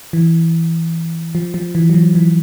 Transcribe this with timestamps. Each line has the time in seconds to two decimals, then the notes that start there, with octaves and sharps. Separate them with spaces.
0.13 E3
1.35 F3
1.54 F3
1.75 E3
1.90 F#3
1.94 F3
2.15 E3